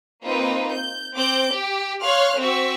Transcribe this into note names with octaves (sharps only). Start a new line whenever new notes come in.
A#3 C4 D#4 F4 B4
G6
C4 D6 G6
G4
C#5 F5 C6 F6 F#6
C4 F#4 C#6 E6 B6